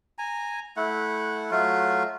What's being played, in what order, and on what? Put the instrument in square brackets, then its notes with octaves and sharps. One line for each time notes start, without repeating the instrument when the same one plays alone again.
[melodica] G#5 A#5
A3 E4 F#5
F#3 A3 F4 F#4